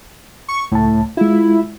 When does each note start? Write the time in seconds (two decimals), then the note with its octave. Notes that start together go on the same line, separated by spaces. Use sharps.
0.48 C#6
0.72 C#2 A2 A5
1.17 G#3 E4 F4